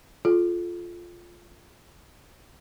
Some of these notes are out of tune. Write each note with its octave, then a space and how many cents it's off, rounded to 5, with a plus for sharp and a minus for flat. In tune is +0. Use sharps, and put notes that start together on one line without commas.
F4 +0 A4 -35